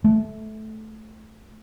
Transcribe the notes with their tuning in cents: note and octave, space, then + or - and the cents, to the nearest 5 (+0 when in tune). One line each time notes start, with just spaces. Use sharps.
A3 -15